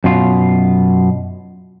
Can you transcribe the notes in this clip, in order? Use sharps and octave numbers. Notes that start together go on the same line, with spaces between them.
F#2 B2 F4